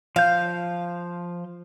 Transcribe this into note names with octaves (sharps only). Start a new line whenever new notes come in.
F3 F5 G6